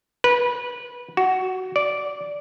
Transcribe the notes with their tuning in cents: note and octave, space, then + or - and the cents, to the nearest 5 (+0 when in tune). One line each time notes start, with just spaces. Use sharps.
B4 -20
F#4 +10
D5 -10